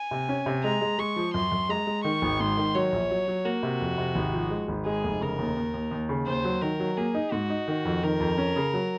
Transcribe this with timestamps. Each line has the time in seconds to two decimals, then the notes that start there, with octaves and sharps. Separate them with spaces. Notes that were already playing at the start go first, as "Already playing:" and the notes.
Already playing: G#5
0.11 C3
0.29 C#4
0.46 C3
0.63 G#3 A#5
0.81 G#3
0.98 G#3 C#6
1.16 F3
1.34 F#2 C6
1.52 F#2
1.69 G#3 A#5
1.87 G#3
2.04 D#3 C#6
2.22 G#1
2.39 G#2 C6
2.57 D#3
2.75 F#3 C#5
2.92 A#1
3.10 F#3
3.28 F#3
3.45 A#3 F#4
3.63 C3
3.81 F2
3.98 C3
4.15 G#1
4.33 F3
4.51 G#3
4.68 G#1
4.86 G#3 G#4
5.04 F1
5.21 C#3 A#4
5.39 D#2
5.57 D#2
5.74 D#2
5.91 D#2
6.09 C#3
6.26 D#2 C5
6.44 F#3
6.62 D#3 A#4
6.80 F#3
6.97 A#3 G#4
7.15 D#4
7.32 G#2 F#4
7.50 D#4
7.68 D#3
7.85 F2
8.03 D#3 A#4
8.20 F2
8.38 C#4
8.56 C#3
8.74 F#3